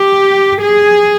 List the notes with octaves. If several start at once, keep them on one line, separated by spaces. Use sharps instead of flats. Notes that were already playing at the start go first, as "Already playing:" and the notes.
Already playing: G4
G#4